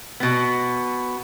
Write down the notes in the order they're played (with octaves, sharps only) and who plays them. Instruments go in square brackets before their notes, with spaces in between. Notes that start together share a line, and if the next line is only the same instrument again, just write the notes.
[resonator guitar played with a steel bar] B2 B3